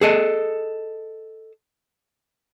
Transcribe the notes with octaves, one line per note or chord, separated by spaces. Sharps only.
G#4 A4 D#5